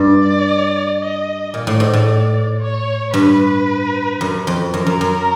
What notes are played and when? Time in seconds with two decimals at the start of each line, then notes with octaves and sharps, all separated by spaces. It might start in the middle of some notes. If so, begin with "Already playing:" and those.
Already playing: G2 D5
0.99 D#5
1.54 A#2 D5
1.67 A2
1.80 G#2
1.93 A2
2.60 C#5
3.14 G2 B4
4.21 F#2
4.47 F2
4.74 F#2 A#4
4.87 F#2
5.01 F#2